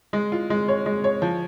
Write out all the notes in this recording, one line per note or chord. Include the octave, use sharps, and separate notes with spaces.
G#3
F4
G#3
C#5
G#3
C#5
F3